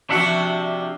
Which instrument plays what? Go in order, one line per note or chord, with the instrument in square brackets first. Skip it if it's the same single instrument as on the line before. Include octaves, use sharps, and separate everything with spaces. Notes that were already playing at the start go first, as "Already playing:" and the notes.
[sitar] C3 F3 F#4 [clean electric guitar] D4 E5 F#5